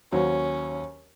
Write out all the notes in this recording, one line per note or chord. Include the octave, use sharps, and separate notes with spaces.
D#2 F#3 C#4 C5